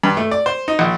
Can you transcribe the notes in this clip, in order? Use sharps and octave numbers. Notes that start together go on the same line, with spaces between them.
G2
A3
D5
C5
D#4
A#1